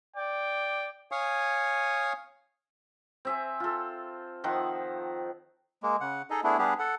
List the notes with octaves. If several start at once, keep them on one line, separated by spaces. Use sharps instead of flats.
D5 G5
C#5 F5 G#5 C#6 D#6
C4 E5 G#5
F4 A4
D#3 F3 C4 F#5
G#3 A#3
C#3 F#5
D#4 G#4 A4 D#5
A3 B3 D4 E4 G#4
G3 B3 D4 G4 G#4
A4 F#5